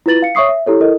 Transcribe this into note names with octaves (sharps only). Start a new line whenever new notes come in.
E4 F4 B4 A6 F#7
F5 C#7
C#5 E5 C#6 D#6 C7
E5
E4 G4 A4 C#5
E4 A4 A#4 D#5